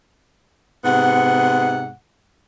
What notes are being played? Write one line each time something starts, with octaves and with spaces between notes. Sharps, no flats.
G#2 C3 B3 F#5